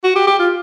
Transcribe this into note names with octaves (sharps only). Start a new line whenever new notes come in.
F#4
G4
G4
F4